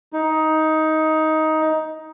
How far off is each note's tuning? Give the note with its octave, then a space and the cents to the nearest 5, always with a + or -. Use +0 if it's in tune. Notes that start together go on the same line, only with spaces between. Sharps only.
D#4 +15